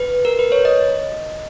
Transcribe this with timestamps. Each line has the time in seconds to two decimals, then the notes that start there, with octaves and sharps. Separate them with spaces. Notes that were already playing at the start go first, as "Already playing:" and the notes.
Already playing: B4
0.25 A#4
0.39 B4
0.52 C#5
0.65 D#5